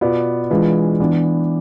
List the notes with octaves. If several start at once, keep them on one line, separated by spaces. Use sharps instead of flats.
B2 B3 F4 B4 D5
E3 G#3 D4 F4 B4
E3 B3 D4